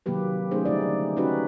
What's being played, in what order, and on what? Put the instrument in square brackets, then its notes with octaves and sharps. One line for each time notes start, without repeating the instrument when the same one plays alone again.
[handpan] C3 D#3 F#3 A#3 G4 B4
A3 C#4 D#4 G#4 C5
D3 G3 D#4 D5
C#4 D#4 F#4 G4 B4